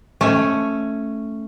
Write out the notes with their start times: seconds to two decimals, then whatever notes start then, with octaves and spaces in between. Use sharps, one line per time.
0.21 A3 C#4 C#5